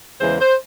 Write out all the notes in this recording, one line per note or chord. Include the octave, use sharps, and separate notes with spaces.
E2 C#3 E3 G#3 C5
C5